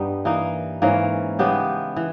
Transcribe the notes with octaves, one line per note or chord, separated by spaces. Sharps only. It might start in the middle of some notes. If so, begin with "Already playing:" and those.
Already playing: G2 G3 B3 D#4
E3 A#3 D#4
G#2 E3 A#3 C#4
C#3 G#3 B3 G4
E3